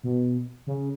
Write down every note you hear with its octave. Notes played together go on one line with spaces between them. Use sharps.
B2
C#3